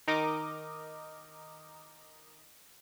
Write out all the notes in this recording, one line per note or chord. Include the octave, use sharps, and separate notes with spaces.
D#3 D#4 A#4 D#5 D6